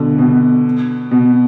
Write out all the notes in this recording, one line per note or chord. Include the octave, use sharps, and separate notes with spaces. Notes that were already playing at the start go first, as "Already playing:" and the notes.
Already playing: B2 D3
B2
B2